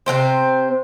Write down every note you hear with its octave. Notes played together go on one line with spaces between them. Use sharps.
C3 F#3 C4 C5